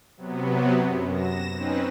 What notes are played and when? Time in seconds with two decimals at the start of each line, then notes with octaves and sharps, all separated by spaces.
0.17 C3 F#3 B3
0.83 F#2
1.12 A#6 E7
1.53 C4 C#4 D#4 B4